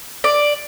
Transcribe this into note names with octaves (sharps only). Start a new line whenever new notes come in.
D5